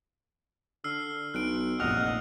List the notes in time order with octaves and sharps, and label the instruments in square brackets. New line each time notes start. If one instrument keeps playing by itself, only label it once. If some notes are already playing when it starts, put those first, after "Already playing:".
[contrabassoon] D3 [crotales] E6 F6 C7
[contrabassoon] B1 [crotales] F#6 D7
[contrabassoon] F1 [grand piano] A#1 F6 [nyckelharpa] D#5 F#5 [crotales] F7